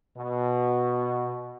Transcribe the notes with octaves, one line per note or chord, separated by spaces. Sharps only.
B2